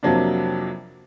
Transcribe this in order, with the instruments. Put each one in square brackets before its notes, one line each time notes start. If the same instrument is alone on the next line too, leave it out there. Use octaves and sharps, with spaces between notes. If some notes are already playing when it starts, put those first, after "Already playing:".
[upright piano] F2 C3 F#3 A#3 D4